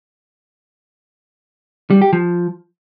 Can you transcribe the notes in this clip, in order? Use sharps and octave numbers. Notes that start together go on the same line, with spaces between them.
G3
G4
F3